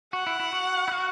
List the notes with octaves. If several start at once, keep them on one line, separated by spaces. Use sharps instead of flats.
F#4 F#5
E4
E4
F#4
E4
F#4